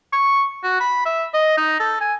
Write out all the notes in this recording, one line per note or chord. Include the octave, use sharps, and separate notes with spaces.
C#6
F#4
B5
E5
D#5
D#4
A4
G#5